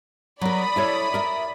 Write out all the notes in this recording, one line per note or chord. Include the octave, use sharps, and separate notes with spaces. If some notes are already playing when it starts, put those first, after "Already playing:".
F#3 A#4 D5 B5 D#6
E4 A4 C#5
A#4 E5